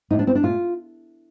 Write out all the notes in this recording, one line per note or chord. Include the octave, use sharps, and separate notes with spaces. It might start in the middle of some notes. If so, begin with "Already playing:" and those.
A2 F3 A3 D#4
D4
C4
D4
A#2 A3 F4